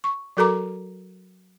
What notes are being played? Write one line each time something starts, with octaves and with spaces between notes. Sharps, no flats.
C#6
F#3 F#4 A4 A#4 A#5 D6